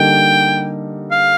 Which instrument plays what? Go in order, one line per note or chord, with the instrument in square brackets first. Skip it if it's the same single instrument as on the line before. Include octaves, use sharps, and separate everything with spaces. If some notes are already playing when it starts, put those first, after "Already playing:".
Already playing: [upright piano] D3 G3 A#3 D#4 A4 [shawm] G5
[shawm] F5